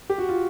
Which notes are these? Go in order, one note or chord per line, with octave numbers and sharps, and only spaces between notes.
G4
F#4
F4